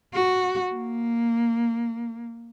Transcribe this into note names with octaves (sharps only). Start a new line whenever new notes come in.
F#4
A#3